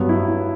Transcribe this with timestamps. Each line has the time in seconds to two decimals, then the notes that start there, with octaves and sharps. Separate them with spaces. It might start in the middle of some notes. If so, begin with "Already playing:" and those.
Already playing: G2 F#3 B3
0.09 E4